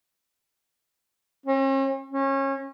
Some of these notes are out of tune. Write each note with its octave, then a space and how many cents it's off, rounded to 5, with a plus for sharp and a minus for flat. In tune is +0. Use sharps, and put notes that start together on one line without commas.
C#4 -45
C#4 -25